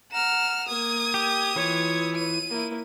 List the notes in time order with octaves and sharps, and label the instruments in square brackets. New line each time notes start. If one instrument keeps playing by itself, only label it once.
[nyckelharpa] F#5 A#5 [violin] F6 E7
[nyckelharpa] A#3 [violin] D#6 G#6
[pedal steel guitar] G4
[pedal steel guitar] E3 [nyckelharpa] F4 C#5
[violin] D#7
[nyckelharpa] A#3 E4